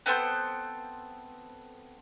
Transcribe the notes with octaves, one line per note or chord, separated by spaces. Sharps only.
B3 C4 A4 C5